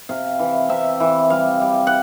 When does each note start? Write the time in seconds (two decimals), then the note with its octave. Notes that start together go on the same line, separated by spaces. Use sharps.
0.09 C3 F5
0.39 E3
0.69 C3 E5
1.00 E3
1.30 G3 F5
1.61 G3
1.87 F#5